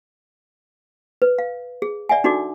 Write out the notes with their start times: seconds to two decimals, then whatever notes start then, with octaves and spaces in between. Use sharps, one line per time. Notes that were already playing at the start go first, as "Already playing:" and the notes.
1.22 B4
1.39 F5
1.82 G#4
2.09 D5 E5 F#5 G#5
2.24 D4 D#4 F#4 A4 D5 D6